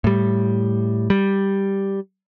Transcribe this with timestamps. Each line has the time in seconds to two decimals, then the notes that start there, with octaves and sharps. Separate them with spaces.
0.04 A2 G3
1.10 G3